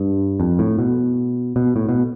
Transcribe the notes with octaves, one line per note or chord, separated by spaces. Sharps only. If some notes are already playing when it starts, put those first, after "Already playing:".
Already playing: G2
F2
A2
B2
B2
A2
B2